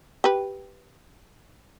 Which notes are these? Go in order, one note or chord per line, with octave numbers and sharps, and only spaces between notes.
G4 B4